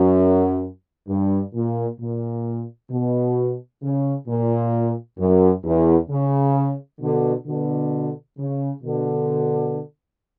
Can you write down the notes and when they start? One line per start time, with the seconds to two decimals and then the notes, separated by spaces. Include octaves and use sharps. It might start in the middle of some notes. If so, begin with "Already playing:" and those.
Already playing: F#2
1.08 G2
1.54 A#2
1.99 A#2
2.91 B2
3.82 C#3
4.27 A#2
5.18 F#2
5.64 E2
6.10 C#3
7.01 B2 D3
7.46 B2 D3
8.38 C#3
8.83 B2 D3